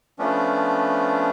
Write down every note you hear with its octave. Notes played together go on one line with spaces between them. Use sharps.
F3 A3 B3 C#4 D4